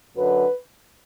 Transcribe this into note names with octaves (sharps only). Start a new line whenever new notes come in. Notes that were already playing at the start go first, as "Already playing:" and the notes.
F#2 D3 F#3 B4